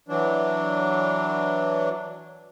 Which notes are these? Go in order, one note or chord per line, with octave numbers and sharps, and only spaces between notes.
E3 F#3 D4